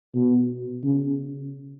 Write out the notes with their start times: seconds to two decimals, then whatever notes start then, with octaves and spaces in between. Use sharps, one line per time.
0.15 B2
0.84 C#3